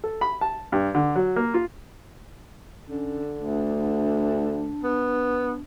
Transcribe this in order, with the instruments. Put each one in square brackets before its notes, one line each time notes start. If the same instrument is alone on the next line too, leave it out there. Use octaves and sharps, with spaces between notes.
[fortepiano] A4
B5
A5
G2
D3
F#3
A#3
F4
[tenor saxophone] D3 [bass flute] C#4
[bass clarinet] D2 [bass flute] D4
[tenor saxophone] B3